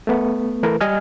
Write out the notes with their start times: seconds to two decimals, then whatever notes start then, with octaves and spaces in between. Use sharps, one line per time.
0.07 A3 B3
0.63 E3 A3 E4 A#4 B4
0.81 G3 D#5 G#5 F6